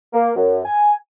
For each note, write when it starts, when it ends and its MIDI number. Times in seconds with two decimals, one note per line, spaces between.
0.14 0.30 58
0.36 0.62 42
0.65 0.95 80